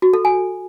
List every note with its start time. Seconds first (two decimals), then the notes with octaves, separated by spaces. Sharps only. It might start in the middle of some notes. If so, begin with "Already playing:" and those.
0.02 F#4
0.13 A4
0.25 G#5